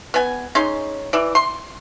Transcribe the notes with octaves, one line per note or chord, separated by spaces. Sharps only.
B3 G#5
G#3 C#4 D#4 C6
E3 D5
C6